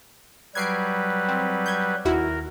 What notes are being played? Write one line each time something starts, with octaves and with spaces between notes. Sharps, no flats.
F#3 G3 B4 G#6 C7 D7
C4
G6 G#6
D#2 E4 F#4 A#4